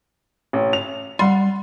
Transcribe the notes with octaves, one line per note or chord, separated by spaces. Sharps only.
A1
F7
G3 F#5 C6